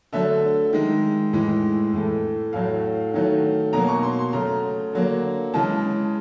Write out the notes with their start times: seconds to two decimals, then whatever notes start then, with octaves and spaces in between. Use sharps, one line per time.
0.13 D3 F#3 A3 E5
0.73 D#3 G#3
1.33 A2 E3 G#3
1.93 A2 E3 A3
2.53 A2 F#3 A3 F5
3.14 D#3 F#3 A3
3.73 B2 F#3 A#3 A#5
3.88 C#6
4.03 C6
4.19 C6
4.33 C#3 F#3 A3 A#5
4.93 D3 F#3 A#3
5.53 C#3 E3 G#3 A5